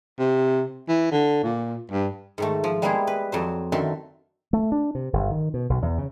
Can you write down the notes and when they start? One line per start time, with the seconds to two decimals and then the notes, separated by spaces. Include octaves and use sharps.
0.19 C3
0.88 E3
1.12 D3
1.43 A#2
1.92 G2
2.38 G#2 D#3 A3
2.64 F3
2.82 G3 G#3 A#3 B3 E4 G#4
3.07 B4
3.32 F2 F#3 C5
3.72 F#2 D3 D#3 E5 A5 C6
4.53 A3
4.72 D4
4.95 C3
5.13 G1
5.30 D#3
5.54 B2
5.70 B1
5.82 E2
5.98 C#3